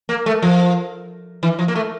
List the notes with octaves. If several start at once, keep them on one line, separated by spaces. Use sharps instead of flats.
A#3
A3
F3
E3
F3
A#3
A3